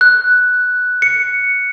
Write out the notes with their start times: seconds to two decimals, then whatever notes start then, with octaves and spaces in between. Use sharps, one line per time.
0.01 F#6
1.02 C#7